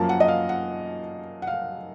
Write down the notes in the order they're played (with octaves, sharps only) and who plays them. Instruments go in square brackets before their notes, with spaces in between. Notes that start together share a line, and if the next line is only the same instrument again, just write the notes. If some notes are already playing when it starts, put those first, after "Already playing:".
Already playing: [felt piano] F#2 F3 A#3 A5
F#5
D#5
F5
F#5
F#5
F5